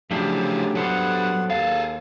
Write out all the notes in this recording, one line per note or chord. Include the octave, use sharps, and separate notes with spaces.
C2 C#3 F3 F#3 A3 D4 E4 G4
F#3 G3 B3 D4 A4 C5 F#5
D#2 G#4 A4 F5